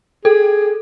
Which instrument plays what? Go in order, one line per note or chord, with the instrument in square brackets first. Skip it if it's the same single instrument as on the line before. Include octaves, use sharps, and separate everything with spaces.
[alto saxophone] G#4 [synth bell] A4